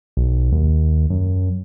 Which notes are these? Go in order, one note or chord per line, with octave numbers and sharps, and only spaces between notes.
B1
D#2
F#2